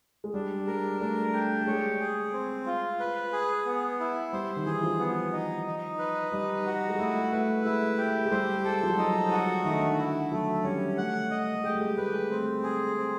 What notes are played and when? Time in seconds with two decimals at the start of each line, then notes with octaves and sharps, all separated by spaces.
0.24 G#3
0.34 G3 D4
0.67 G#3 A#4
1.00 A3 D4
1.33 G4
1.61 A3
1.67 G#3 C#5
2.00 G#4
2.33 C4
2.66 F4
3.00 B4
3.33 G#4
3.66 B3
4.00 E4
4.33 G3 C5
4.56 D#3
4.66 E3 G#4
4.83 F3
4.99 B3
5.32 D#4
5.66 D#4
5.99 B4
6.32 G3 D#4
6.66 F#4
6.89 G#3
6.99 A3 E4
7.32 A3 B4
7.65 G#3 E4
7.98 G4
8.25 G#3
8.31 G3 C5
8.64 G#3 A4
8.83 F3
8.90 F#3
8.98 G3 D#4
9.31 F#4
9.64 D#3 A3
9.72 D3
9.80 D#3
9.98 E4
10.31 F#3 A3
10.64 G3 C#4
10.97 A3 F#5
11.30 D#5
11.55 A3
11.64 G#3 G4
11.74 G3
11.81 G#3
11.97 A3 B4
12.13 G#3
12.30 C4
12.63 G#4
12.97 C4